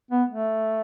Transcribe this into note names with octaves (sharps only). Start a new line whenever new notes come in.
B3
A3